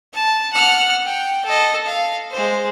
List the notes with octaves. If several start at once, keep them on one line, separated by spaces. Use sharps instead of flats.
A5
F#5 F6
G5
A4 D#5
F5
G#3 C5